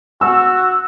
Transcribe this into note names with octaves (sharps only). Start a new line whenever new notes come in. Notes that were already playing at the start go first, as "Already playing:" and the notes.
F#4 E6